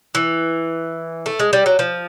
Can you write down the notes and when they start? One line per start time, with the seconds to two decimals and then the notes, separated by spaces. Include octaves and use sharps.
0.15 E3
1.26 A3
1.39 G#3
1.53 G3
1.66 F#3
1.79 F3